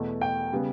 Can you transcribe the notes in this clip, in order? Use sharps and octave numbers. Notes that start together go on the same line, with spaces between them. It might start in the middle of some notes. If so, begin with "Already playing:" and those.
Already playing: E2 B2 A3
G5
C#3 G3 B3